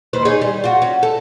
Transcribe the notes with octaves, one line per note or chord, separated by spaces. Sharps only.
D#2 B4 C5
D#4 G#4 C#5
G3
F4 F#4
C#4
A4